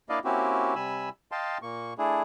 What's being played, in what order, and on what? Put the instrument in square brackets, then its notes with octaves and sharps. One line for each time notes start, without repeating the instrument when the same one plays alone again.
[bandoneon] A#3 D4 E4 D5 D#5 F5
A#3 C4 C#4 E4 F#4 G4
C3 G3 G#5 B5 E6
D#5 F5 G5 A5 C6
A#2 A#3 C#6
A3 D4 E4 G#4